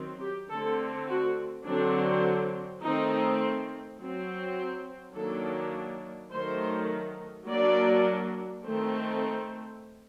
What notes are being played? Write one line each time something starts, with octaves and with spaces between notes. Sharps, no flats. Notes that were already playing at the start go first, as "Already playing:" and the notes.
Already playing: D#3 F#3 C4
G4
D3 A3 C4 A4
F#4
D3 F#3 C4 D4
D#3 A3 C4 D#4
F#3 C4
D#3 F#3 A#3 D4 A4
D#3 F#3 A3 C5
F#3 A#3 D4 D5
D#3 A3 C4